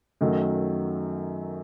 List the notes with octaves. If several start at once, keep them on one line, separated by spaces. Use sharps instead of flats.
F#2 D#3 F#3 A3